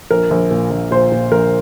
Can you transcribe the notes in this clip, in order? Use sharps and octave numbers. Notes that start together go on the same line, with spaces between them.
A#1 A#4
A#1
A#2
A#1
A#2 C5
A#2
A#1 A#4